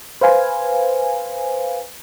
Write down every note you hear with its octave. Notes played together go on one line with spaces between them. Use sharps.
B4 C5 F5 G#5